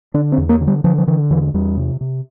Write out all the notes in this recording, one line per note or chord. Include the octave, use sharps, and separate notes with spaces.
D3 D4
C4
E2
A#3
D3
G3
D3 F3
F3
D3 E3
E2 E3
E2 G3
C3
C3